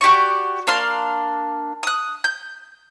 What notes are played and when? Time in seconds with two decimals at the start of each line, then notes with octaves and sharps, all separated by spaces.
0.01 F#4 G4 D5 C#6
0.67 A#3 D4 F5 C6
1.83 D#6 F#6
2.24 G6